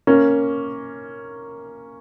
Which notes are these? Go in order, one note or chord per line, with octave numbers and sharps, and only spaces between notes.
A#3 C#4